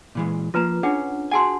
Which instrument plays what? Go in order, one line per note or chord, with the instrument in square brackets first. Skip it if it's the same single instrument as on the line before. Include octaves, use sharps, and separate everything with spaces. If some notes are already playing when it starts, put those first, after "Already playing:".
[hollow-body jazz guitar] A#2 E3 G#3
[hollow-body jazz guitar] F3 A#3 [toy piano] F4 B4 A#5
[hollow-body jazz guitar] C#4 [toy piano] D4 G#4 F#5
[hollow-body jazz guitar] F#4 G#4 G#5 [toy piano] F#5 A5 C6